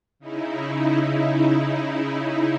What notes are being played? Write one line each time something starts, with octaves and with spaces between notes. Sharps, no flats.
C#3 D#4 E4